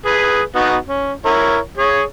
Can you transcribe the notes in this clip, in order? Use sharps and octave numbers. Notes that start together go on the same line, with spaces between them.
G#4 B4
B3 D#4 F#4
C#4
E4 A#4 C#5
G#4 C#5